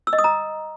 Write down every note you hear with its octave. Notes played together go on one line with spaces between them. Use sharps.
E6
D#5
D#6
A#5